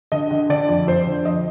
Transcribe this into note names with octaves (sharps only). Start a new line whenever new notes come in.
D3 D#5
D3
D3 D5
F2
F2 C5
D3
F2 D#5